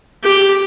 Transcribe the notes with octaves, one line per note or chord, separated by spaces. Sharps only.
G4